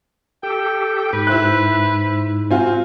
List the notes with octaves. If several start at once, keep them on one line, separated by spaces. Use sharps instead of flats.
G4 A4 G5
G#2 B4
E4 C5 F#6
C4 F4 F#4 G#5